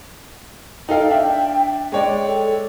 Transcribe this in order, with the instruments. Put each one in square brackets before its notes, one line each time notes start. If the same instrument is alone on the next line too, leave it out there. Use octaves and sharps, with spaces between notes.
[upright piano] D#4 A4 F5 [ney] G5
[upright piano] D4 E5 [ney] G5
[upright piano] G#3 C#5 D5 [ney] G5
[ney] A4